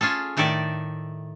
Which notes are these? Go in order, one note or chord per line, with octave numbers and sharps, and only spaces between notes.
C#4 F4 G#4 A4
A2 D#3 A4 D5 E5